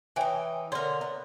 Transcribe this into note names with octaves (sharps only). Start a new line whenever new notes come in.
E3 D#4 C#5 G5 G#5
D3 A#4 C#5 C6
B3